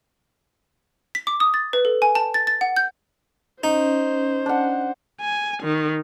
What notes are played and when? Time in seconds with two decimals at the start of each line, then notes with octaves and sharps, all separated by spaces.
1.15 B6
1.27 D6
1.40 D#6
1.54 A6
1.73 B4
1.85 A4
2.02 G#5
2.15 A5
2.34 A6
2.47 A6
2.61 F#5
2.76 G6
3.64 C#4 D#4 C5
4.46 D4 F#5
5.20 G#5
5.62 D#3